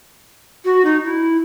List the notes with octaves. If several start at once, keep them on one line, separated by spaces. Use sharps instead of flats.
F#4
D#4
E4